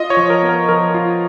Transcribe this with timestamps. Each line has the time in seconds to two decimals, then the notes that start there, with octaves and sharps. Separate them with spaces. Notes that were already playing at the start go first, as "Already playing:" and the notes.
Already playing: F4 D#5
0.10 C#5
0.17 F3
0.30 A#4
0.43 B3
0.49 A#4
0.69 F3 A#4
0.94 F4